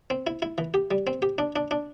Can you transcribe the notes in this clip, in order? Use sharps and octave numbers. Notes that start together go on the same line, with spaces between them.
C4
E4
E4
E3
G4
G3
C4
G4
D4
D4
D4